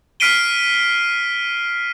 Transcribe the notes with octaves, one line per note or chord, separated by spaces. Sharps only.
F6 B6 C7 D7 D#7 G7